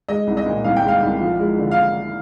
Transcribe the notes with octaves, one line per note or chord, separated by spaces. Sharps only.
G#3 D#5
C2
D#5
A#2
C2 F5
G5
G#3 F5
C2
F3
G#3
D3
F5